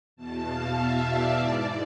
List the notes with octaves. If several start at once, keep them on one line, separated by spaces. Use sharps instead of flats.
E2 B2 A5
F5
E5
D5
G#2 E3